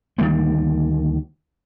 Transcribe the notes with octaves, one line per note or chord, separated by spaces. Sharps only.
D2 D#3 G3 A#3